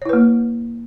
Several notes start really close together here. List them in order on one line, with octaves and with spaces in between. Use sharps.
C#5 E4 B4 A#3